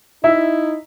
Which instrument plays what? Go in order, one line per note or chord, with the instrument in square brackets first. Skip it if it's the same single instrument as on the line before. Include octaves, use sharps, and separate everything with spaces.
[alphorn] D#4 [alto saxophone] E4 [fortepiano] E5